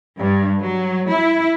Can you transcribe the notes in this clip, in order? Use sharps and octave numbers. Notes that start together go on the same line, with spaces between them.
G2
F#3
E4